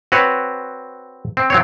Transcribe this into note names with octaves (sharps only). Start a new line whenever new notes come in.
C4 F#4 B4 C#5
C4
F#3 C4 C#5